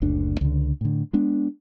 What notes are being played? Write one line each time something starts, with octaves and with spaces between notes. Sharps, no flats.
F#1 D2 D3 D4
C#2 D3
A2 D3
G#3 B3 D4